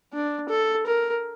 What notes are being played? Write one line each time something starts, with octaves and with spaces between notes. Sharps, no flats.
D4
A4
A#4